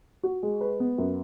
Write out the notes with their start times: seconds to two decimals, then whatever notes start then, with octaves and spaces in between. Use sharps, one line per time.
0.23 F#4
0.43 G#3
0.61 B4
0.80 B3
0.98 F#2